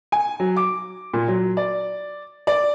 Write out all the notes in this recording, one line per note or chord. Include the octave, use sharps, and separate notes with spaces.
G#5
F#3
D6
A#2
F#3
D5
D5